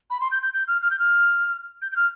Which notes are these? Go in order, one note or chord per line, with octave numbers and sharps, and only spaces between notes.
B5
C6
G6
G6
G6
F6
F6
G6
F6
G6
G6
F6